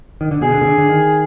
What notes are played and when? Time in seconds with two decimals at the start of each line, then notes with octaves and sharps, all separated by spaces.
0.21 D#3
0.31 D3
0.41 B2 G#4
0.54 D3
0.61 B2
0.66 D3
0.78 D3
0.89 D#3